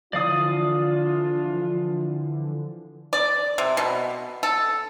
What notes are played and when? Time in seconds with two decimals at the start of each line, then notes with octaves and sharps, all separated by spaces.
0.13 D3 E3 F3 D4 F4 D5 F5 D#6
3.13 D5
3.58 C3
3.77 B2
4.43 A4